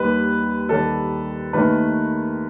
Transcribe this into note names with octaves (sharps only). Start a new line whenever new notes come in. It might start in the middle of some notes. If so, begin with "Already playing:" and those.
Already playing: D#2 D#3 G3 B4
D#2 D#3 G3 A4
D#2 D#3 A3 B4